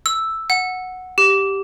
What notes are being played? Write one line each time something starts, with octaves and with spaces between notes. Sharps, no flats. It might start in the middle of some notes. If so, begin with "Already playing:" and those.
E6
F#5
G4